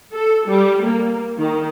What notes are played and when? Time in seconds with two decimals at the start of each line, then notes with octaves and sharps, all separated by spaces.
0.13 A4
0.48 G3
0.85 A#3
1.38 D#3